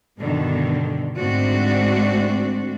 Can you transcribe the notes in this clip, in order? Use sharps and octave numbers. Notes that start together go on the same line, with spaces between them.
G2 B2 D3 D#3
G#2 D3 A3 C4 D4 F#4